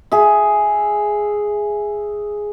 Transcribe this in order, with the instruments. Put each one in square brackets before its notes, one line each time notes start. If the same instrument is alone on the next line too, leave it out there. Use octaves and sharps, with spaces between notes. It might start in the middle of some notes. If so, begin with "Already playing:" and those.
[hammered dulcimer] G#4 E5